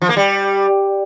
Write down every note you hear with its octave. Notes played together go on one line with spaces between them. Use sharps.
F3
A#3
G3